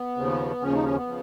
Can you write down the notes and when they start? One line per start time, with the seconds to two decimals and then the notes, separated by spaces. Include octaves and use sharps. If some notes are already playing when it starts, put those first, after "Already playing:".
Already playing: B3
0.16 D#2 C#3 F3
0.61 D#2 C#3 F3 C#4
0.73 D#4
0.84 C#4
0.95 B3
1.07 C#3 F3